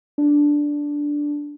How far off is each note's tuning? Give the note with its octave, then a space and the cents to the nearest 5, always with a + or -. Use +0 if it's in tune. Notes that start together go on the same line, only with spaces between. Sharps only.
D4 -5